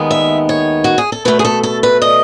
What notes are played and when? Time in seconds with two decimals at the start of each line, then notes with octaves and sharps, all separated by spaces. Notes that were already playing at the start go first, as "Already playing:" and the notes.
Already playing: D#2 D#3 G#3 B3
0.11 E5
0.49 C#5
0.84 F#4
0.98 G#4
1.12 A4
1.25 B2 A3 B4
1.39 G#4
1.45 A4
1.63 A4
1.83 B4
2.02 D#5